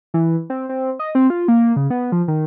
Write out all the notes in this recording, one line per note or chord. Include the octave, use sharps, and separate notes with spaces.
E3
C4
C4
D#5
C4
F4
A#3
C#3
B3
F3
D#3